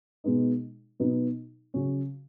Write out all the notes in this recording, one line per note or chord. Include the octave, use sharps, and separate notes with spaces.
B2 G#3 B3 D#4
B2 F#3 B3 D#4
C#3 F#3 C#4